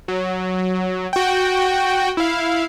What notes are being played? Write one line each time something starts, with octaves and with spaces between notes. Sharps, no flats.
F#3
F#4 G5
E4 F5